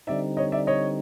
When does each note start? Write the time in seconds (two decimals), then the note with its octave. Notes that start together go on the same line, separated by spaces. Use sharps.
0.07 D3 G3 C4 D#4 D5 E5
0.37 C#5 D#5
0.52 D5 E5
0.67 C#5 D#5